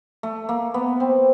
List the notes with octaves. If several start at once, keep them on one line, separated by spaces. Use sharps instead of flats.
A3
A#3
B3
C4